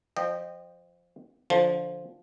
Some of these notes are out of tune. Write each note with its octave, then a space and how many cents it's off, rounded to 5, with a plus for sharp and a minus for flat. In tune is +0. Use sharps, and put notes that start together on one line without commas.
F3 +0 D#5 -25 G5 +0
D3 -10 F3 +0